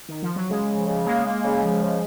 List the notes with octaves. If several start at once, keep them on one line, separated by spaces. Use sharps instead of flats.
D#3
F3
F#3
C#3 G#3
F3
C#3
G#3 A#3
A#3
C#3
F3
C#3